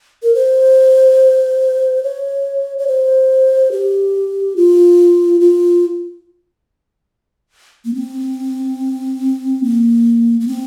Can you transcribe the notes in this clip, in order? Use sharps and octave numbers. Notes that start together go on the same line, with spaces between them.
A#4
C5
C#5
C#5
C5
G4
F4
F4
A#3
C4
A#3
A#3
C4